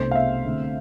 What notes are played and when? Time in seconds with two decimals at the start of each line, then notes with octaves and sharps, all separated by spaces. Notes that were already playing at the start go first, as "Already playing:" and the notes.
Already playing: C2 B2 A3 D4 A4 C5
0.11 F5
0.15 E5
0.45 D3 A3 C4